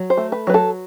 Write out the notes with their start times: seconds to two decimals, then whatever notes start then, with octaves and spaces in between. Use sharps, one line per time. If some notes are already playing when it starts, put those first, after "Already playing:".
Already playing: F#3
0.10 C5
0.17 A3
0.32 B4
0.47 F#3 B4
0.54 A4